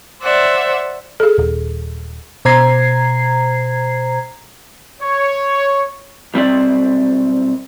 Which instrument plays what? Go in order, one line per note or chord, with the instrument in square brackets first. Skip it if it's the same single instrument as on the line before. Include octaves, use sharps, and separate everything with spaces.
[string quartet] C5 D5 E5 F#5
[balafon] G#4 A4
[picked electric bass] D#1
[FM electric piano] B2 C5 A#5 G#6 C7
[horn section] C#5
[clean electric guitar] B1 G3 C4 D5